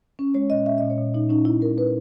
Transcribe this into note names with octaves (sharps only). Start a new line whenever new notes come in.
C#4
G#3 C#5
A#2 D#5
C#4 E5
A#2 D#5
C#5
A#2
A#2 D#4
C#4 D#4
A#2 E4
G#3 A#4
A#2 B4